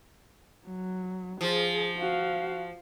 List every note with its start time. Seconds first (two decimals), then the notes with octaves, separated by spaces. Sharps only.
0.67 F#3
1.41 F3 G#4
1.98 F#4 F5